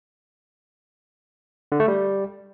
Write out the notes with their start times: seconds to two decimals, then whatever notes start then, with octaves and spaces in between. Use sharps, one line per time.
1.72 D3
1.80 A3
1.88 G3